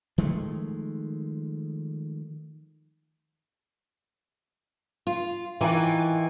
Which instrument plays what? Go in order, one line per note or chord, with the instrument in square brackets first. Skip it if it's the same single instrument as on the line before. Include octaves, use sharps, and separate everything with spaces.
[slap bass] D#3 F3 G#3 A3
[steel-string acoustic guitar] F4
[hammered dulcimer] D#3 G#5 A#5 [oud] E3 [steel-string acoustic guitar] F4